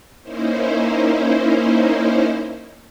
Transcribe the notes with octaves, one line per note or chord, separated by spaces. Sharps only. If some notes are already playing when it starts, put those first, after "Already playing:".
A#3 C#4 D#4 E4 C5